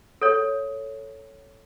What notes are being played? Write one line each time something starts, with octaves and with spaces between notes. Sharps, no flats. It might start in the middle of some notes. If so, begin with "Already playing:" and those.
A4 C#5